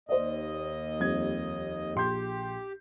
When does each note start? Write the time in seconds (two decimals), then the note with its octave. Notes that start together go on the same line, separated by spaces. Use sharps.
0.09 D#2 C5 D5 D#5
1.00 F2 G3 G#6
1.95 A#1 G4 C6 G6